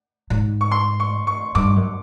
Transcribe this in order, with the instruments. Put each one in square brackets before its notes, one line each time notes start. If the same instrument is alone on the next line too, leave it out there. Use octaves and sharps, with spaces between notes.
[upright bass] G#2
[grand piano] C#6
C6
C#6
C#6
[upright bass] G2 [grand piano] D6
[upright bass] F#2